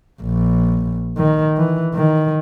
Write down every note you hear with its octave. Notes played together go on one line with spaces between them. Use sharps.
A#1
D#3
E3
D#3